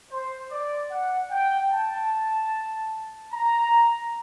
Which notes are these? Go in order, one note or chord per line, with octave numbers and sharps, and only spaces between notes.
C5
D5
F#5
G5
A5
A#5